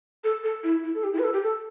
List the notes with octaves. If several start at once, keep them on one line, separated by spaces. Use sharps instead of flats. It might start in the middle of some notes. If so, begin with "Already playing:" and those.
A4
A4
E4
E4
A4
G4
E4
B4
A4
G4
A4